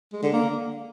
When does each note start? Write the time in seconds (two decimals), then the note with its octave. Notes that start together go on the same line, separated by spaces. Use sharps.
0.12 G#3
0.22 D3
0.33 A#3